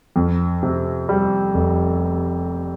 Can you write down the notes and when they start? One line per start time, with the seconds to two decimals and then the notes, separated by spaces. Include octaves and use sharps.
0.16 F2
0.63 C3
1.09 G3
1.54 F1